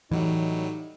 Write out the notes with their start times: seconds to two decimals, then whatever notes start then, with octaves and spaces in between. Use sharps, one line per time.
0.11 A2 E3 F#3 G3 D#4